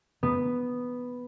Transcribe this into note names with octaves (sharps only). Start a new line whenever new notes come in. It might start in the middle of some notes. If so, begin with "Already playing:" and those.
B3